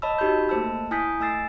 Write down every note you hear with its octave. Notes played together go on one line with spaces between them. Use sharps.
C#5 D#5 A5 B5 E6
D#4 F#4 G4 B5 C6 G6
A3 A#3 C5 A5 E6
E4 G#5 D#6 G6 B6
A3 G#5 E6 A6 C7